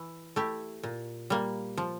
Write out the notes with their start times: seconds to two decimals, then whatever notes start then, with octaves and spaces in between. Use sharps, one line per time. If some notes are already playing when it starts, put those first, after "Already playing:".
Already playing: E3
0.36 A3 E4 G4
0.83 A#2
1.30 G3 A#3
1.77 F3